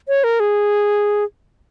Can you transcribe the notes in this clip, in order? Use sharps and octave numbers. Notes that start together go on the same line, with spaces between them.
C#5
A#4
G#4